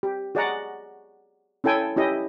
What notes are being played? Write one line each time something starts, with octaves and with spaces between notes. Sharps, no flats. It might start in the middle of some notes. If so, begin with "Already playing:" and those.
G4
F#4 G#4 D5 D#5 F#5 A#5
C#4 E4 A4 G5 G#5
C#4 E4 G4 D#5